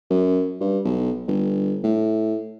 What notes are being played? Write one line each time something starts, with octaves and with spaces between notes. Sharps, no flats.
F#2
G2
B1
G1
A2